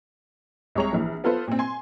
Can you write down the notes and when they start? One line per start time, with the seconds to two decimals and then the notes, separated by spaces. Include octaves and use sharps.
0.75 C2 G#3 C#5 A#5 F7
0.93 A#1 E3
1.24 B3 F4 A4 B4 C5
1.47 A#2 C4
1.59 G#5 C6